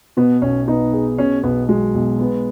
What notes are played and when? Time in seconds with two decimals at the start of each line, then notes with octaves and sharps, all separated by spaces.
0.17 B2 B3
0.42 B1 C#4
0.67 B3 D#4
0.93 G#4
1.18 B2 C#4
1.43 B1 B3
1.69 F#3 G#3
1.94 B1
2.20 B3